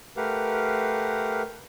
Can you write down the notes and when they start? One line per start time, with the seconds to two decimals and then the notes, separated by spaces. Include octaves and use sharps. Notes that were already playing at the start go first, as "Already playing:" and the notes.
0.17 A3 G4 A#4 B4 F5 F#5